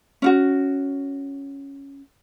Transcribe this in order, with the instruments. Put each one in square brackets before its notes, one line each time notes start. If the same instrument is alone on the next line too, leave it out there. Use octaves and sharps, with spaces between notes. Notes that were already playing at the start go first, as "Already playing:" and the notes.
[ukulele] C#4 F4 F#4